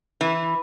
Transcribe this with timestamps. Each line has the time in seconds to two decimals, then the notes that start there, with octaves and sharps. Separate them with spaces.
0.21 E3